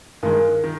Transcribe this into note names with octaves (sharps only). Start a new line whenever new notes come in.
G2 D#3 G#3 A#4
D#3